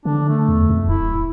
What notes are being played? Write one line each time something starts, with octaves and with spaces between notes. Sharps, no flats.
D3 D4
A3
E2
F2
D1 E4